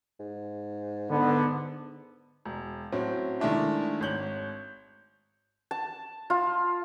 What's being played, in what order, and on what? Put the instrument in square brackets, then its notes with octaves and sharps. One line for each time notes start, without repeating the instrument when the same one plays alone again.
[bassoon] G#2
[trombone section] D3 B3
[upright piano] E1
A2 F#3 C4 C#4
D#3 G#3 A3 D4 E4
G#1 C#5 G6 F#7
[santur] A5
F4